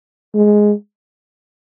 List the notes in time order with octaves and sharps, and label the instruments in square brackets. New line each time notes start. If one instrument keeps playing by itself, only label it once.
[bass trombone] G#3